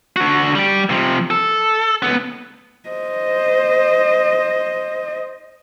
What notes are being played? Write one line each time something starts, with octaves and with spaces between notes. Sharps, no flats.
D3 F#4
G3 G4
C3 F3
A4
C#2 B3
C5 D#5